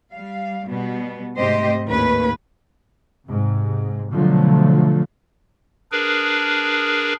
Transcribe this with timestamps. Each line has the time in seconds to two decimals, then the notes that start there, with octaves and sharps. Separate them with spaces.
0.13 G3 F5
0.67 B2 G3 B3
1.39 G#2 C3 A3 G4 C5 D#5
1.87 D#2 A2 C#4 B4
3.28 G#2 C3
4.12 B2 D3 F3 F#3 A3
5.92 D4 G#4 A#4 B4